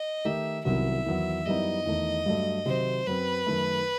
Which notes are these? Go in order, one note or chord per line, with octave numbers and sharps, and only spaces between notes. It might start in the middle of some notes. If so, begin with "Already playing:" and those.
Already playing: D#5
D#3 A3 D#4 G4 E5
C2 C3 D#3 F#3 B3 E5
E2 D#3 F#3 B3
F#2 E3 G3 B3 D#4 D#5
E2 D#3 A3 D#4
G2 F#3 A3
C3 D#3 F#3 C5
F#2 F#3 C4 B4
F#2 D#3 A3